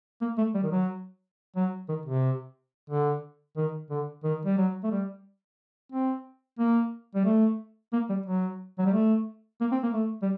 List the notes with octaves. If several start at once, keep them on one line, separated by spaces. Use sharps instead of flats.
A#3
A3
G3
D#3
F#3
F#3
D#3
C3
D3
D#3
D3
D#3
G3
F#3
A3
G3
C4
A#3
G3
A3
A#3
G3
F#3
F#3
G3
A3
A#3
C4
A#3
A3
G3